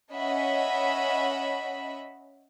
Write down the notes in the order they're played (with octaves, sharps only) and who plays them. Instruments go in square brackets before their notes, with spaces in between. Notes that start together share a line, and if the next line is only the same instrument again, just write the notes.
[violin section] C#4 D#5 E5 F#5 B5